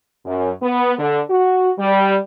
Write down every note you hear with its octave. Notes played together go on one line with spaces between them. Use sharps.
F#2
B3
D3
F#4
G3